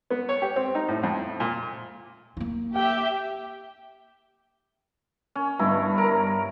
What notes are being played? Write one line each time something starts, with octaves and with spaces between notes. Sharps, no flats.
B3
C#5
G4
C4
D#4
A2
F2
A#2
A#3 E4
G4 E5 G5
C#4
G1 G2 E4
A#4